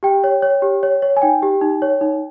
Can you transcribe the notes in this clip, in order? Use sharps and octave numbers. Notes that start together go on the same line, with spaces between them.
G4 G5
C#5
C#5
G4
C#5
C#5
G#5
D#4 G5
G4
D#4
C#5
D#4